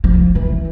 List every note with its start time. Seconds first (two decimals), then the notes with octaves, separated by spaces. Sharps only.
0.04 F3
0.35 E3